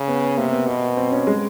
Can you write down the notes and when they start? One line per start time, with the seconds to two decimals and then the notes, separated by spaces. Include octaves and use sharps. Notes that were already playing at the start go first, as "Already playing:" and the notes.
Already playing: C#3
0.08 B3
0.38 C3 A#3
0.53 B3
0.67 B2 B3
0.97 C4
1.12 C#4
1.27 G#3